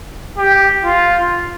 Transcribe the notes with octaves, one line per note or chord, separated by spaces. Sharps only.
G4
F4